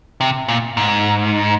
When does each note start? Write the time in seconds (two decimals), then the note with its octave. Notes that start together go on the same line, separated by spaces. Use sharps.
0.21 C3
0.48 A#2
0.77 G#2